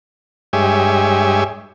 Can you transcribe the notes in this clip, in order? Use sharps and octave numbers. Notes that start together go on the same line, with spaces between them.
G2 G#3 G4 C#5 E5 G#5